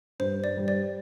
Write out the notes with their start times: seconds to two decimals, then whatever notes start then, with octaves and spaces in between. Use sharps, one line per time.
0.19 G2 C5
0.44 D5
0.57 G3
0.68 D5